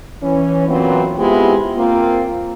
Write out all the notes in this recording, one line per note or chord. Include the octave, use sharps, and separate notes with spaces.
E3 C#4
A#2 E3 F#3 B3 C4
G#3 B3 C4 E4 F4 G4
A#3 C4 F4